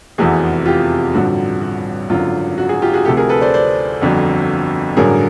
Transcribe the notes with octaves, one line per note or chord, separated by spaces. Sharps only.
F1 E2 C3 E3 F#4 G#4
F4 G4
A1 G2 D3 F3 F#4
F#4
G#1 F#2 D3 F4
F#4
F#4 G#4
F4 G4
F#4 G#4
D2 C3 F3 G4 A4
G#4 A#4
A4 B4
C5 D5
C5 D5
G1 F2 D3 F#3
A1 G2 D3 F#3 G#4 A#4